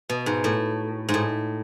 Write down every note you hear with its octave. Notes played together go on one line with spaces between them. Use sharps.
B2
G#2
A2
G#2
A2